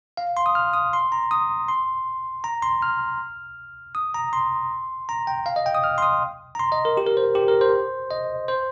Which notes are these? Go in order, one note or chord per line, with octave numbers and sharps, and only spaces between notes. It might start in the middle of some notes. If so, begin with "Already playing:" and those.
F5
C6
D#6
F6
D#6
C6
A#5
D#6
C6
A#5
C6
F6
D#6
A#5
C6
A#5
G5
F5
D#5
G5
D#6
F6
C6
D#6
A#5
C6
D#5
A#4
G4
A#4
C5
G4
A#4
C5
D#5
C5